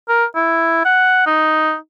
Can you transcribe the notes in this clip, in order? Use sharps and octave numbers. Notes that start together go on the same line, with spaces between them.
A#4
E4
F#5
D#4